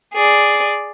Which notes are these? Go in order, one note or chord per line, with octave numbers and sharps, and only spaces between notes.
G#4 D5